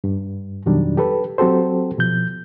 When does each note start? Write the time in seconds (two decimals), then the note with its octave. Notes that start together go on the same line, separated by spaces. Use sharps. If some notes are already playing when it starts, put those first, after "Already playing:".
0.04 G2
0.66 F2 B2 D#3 F#3 G3 D4
0.97 G4 A4 B4
1.38 F#3 C4 F#4 G4 A4 C5
1.98 B2 F3 G6